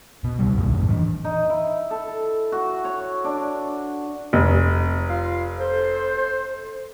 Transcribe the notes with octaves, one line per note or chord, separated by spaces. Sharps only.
B2
C#2 G3
B1 G2 A#2
G#1 F2 A#2
E3 D4
D#4
E4
A4
F#4
C#5
D4
F1
F4 F5
A4 C5